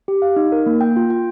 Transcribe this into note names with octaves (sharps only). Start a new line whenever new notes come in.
G4
F5
D#4
A#4
A#3
G5
F4
G5